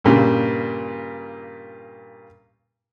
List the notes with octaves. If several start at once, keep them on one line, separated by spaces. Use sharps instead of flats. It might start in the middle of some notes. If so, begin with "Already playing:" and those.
G2 A#2 C#3 G3